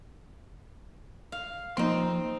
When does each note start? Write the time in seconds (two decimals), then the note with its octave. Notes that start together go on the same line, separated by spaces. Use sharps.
1.32 F5
1.77 F3 A#3 C4 D#4 C6